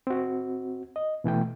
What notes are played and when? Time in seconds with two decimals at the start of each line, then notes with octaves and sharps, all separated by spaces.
0.07 C4 F#4
0.96 D#5
1.24 B2 E3 A3 G5